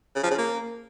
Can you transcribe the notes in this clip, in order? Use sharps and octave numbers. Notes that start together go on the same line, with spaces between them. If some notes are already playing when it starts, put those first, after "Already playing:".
C#3
F3
C#3
A#3